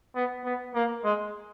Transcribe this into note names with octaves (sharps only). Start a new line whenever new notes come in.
B3
B3
A#3
G#3